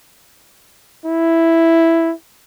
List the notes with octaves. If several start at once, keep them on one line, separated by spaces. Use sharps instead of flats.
E4